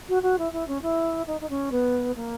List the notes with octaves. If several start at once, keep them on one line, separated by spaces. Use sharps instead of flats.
F#4
F#4
E4
E4
C#4
E4
D#4
D#4
C#4
B3
A#3